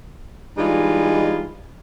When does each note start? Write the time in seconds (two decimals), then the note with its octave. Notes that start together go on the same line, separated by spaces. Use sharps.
0.58 E3 G3 G#3 D4 D#4 F4